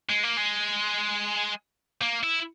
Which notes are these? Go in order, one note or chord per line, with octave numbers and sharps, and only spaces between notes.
G#3
A#3
G#3
A#3
E4